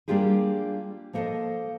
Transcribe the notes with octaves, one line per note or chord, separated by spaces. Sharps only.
G3 A#3 D4 F4 G4 G#4
F3 A#3 A4 B4 C5 D#5